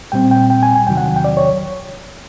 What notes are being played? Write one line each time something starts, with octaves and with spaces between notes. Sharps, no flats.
A#2 G3 C4 G5
G5
G5
G#5
G#5
E2 C3 D#3 F#3 G5
F#5
G5
D5
C#5